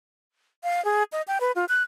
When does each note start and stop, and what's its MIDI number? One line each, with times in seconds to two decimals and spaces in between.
0.63 0.83 77
0.85 1.03 68
1.12 1.22 75
1.28 1.38 79
1.41 1.52 71
1.56 1.65 65
1.69 1.83 90